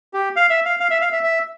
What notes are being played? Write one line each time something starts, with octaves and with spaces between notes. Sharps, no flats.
G4
F5
E5
F5
F5
E5
F5
E5
E5